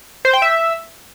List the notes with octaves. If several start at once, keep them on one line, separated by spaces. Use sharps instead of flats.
C5
G5
E5